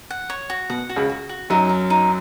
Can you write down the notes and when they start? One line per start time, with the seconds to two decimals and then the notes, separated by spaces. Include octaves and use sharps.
0.10 F#5
0.30 C#5
0.50 F#4
0.70 B2 F#5
0.89 F#4
0.96 C#2 C#3
1.09 F#4
1.29 F#4
1.50 F#2 F#3 D#4
1.69 F5
1.90 D#4